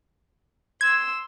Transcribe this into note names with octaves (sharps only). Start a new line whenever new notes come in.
C6 E6 G#6